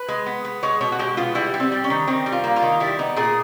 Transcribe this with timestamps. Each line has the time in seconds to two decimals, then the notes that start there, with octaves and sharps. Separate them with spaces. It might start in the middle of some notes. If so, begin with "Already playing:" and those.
Already playing: B4
0.08 G#3
0.26 B3
0.45 B3
0.63 G#3 C#5
0.81 B2 C#5
0.92 F#4
0.99 G#3 G4
1.17 B3 F4
1.35 G3 E4
1.54 G3
1.60 C4
1.72 G3
1.84 C#4
1.90 D#3
2.07 D#3 C4
2.26 G3
2.32 F4
2.44 A#3
2.56 F4
2.62 D#3
2.80 G3 E4
2.99 B3 D#4
3.16 A#2 G#4